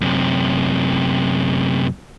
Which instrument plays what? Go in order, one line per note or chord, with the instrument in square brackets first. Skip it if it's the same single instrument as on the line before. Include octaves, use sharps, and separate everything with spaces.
[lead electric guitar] F#2 C3